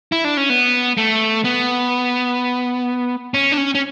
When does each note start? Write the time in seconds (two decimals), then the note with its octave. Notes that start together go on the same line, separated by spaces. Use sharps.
0.12 E4
0.24 D4
0.37 C#4
0.50 B3
0.97 A3
1.44 B3
3.34 C#4
3.52 D4
3.58 C#4
3.75 C#4